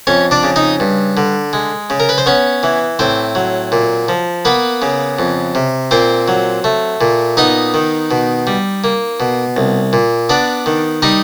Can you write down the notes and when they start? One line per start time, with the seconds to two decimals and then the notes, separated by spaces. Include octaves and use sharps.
0.07 F2 C#4 C#5
0.31 D4 D5
0.43 C#3
0.56 D#4 D#5
0.80 G2
1.17 D3
1.53 G#3
1.90 C#3
2.00 A#4
2.09 B4
2.18 C5
2.26 B3 C#4 C#5
2.63 E3
2.99 A2 C4 C5
3.35 F#3
3.72 A#2
4.08 F3
4.45 A#3 B3 B4
4.82 C#3
5.19 F2
5.55 C3
5.91 A#2 C4 C5
6.28 F#3
6.64 A3
7.01 A#2
7.37 B3 D#4 D#5
7.74 D#3
8.11 B2
8.47 G3
8.84 A#3
9.20 B2
9.57 C2
9.93 A#2
10.29 B3 D4 D5
10.66 D#3
11.02 G3 D#4 D#5